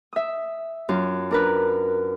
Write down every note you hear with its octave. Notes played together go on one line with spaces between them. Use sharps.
E5 D#6
F#2 F4
D4 A#4 B4